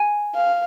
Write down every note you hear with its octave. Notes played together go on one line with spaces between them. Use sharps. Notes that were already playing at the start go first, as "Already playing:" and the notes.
Already playing: G#5
F5